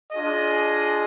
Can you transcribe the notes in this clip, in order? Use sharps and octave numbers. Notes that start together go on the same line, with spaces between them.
D4 F4 G#4 D#5